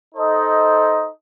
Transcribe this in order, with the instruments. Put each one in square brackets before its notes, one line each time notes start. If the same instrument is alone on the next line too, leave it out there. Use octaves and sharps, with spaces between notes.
[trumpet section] D#4 A4 C5 D#5